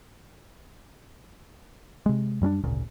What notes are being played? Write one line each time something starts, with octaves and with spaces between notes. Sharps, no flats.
C3 G#3
F#2 G3 C#4 D4
G#1 D2 A#2 C#3